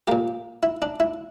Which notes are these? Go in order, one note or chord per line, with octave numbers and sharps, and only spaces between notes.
A#2 A#3 G4
E4
D4
E4